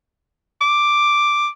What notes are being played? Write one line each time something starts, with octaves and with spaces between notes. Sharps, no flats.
D6